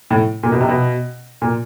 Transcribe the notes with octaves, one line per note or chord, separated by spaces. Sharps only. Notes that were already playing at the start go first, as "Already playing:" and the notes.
A2
A#2
B2
C3
B2
A#2